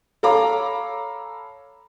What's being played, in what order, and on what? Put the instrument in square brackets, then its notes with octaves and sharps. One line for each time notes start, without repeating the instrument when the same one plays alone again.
[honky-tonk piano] A4 C#5 F5 A#5 B5 D6